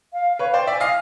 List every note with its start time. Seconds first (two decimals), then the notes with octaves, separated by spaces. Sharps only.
0.13 F5
0.33 F5
0.39 B4 C#5
0.53 C5 D5 G5
0.67 D5 E5
0.73 G#5
0.80 D#5 F5